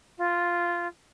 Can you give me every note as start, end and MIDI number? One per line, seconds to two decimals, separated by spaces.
0.18 0.87 65